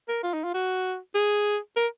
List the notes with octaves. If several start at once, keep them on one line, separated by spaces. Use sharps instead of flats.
A#4
F4
D#4
F4
F#4
G#4
A#4